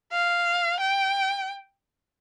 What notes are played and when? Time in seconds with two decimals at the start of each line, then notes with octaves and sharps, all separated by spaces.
0.12 F5
0.80 G5